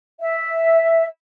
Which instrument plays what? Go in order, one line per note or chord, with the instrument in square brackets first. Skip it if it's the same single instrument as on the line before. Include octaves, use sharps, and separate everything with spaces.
[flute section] E5